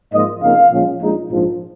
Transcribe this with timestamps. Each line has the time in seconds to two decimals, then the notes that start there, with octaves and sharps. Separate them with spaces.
0.12 G#2 F3 A#3 F4 D#5
0.42 F2 C#3 A#3 D#4 F5
0.70 A#2 F3 G#3 C#4
1.00 A#1 A#2 G#3 D#4
1.30 A#1 G#2 F3